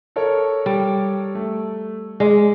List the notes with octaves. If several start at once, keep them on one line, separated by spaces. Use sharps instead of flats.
A4 A#4 C#5
G3
A3
G#3 D5